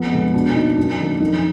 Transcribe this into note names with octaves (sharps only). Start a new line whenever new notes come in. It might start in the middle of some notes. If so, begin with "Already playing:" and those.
Already playing: F2 B3
D3 G#3
B2 D4
A#3 D#4
F#2 D4
D#3 A#3
F2 D#4